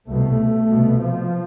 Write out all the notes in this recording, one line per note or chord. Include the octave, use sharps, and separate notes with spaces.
C2 B2 A3
C2 B2
F3